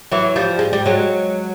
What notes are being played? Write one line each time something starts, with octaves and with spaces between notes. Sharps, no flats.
E3 F#3
F3 G3
G#3
G3
F#3 G#3